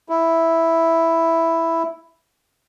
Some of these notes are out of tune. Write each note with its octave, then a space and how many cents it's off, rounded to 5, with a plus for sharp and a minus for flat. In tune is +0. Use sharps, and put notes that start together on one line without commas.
E4 +0